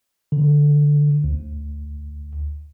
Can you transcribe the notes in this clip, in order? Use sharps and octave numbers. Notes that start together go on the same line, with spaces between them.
D3
D2